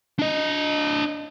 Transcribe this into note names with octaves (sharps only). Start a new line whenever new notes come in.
D4 D#5